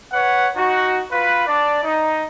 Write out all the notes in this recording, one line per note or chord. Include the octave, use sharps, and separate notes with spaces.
B4 C#5 F#5
D#4 F#4
F4 B4
D4 D5
D#4